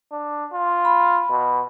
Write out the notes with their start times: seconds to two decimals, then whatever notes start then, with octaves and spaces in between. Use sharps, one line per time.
0.12 D4
0.53 F4
0.85 B5
1.30 B2